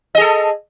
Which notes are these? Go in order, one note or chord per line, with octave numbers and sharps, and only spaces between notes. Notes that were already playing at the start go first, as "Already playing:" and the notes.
G#4 A4 D#5